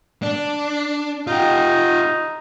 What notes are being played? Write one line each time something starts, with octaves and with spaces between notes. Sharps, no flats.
D4
D#4 F4 G4